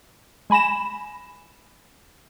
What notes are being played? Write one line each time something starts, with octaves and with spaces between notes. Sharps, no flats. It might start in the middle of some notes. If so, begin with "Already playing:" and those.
G#3 G#5 B5 A#6 E7